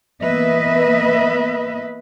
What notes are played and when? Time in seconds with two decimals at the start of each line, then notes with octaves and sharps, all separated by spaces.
0.23 E3 A#3 B3 B4 D#5 E5